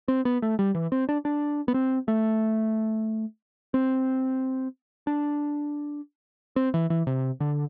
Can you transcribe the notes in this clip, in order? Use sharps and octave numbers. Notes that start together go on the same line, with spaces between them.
C4
B3
A3
G3
E3
C4
D4
D4
B3
C4
A3
C4
D4
C4
E3
E3
C3
D3